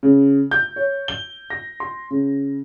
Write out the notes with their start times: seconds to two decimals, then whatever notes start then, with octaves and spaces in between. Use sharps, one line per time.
0.03 C#3
0.51 G6
0.76 C#5
1.08 G7
1.50 A#6
1.80 C6
2.11 C#3